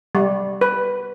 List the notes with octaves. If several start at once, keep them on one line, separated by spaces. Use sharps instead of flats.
G3
B4